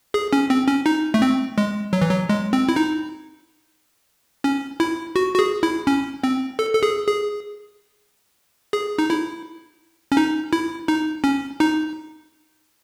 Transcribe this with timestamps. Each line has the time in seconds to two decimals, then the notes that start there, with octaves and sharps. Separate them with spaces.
0.14 G#4
0.33 C#4
0.50 C4
0.68 C#4
0.86 D#4
1.14 A3
1.22 C4
1.58 G#3
1.93 F#3
2.02 E3
2.11 F#3
2.29 G#3
2.53 C4
2.69 E4
2.76 D#4
4.44 C#4
4.80 E4
5.16 F#4
5.34 F#4
5.39 G#4
5.63 E4
5.87 C#4
6.24 C4
6.59 A4
6.74 A4
6.83 G#4
7.07 G#4
8.73 G#4
8.98 D#4
9.10 E4
10.12 C#4
10.17 D#4
10.53 E4
10.88 D#4
11.24 C#4
11.60 D#4